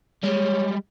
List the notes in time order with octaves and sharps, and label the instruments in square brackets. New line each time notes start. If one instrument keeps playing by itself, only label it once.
[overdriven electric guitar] G3 G#3 [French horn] C#5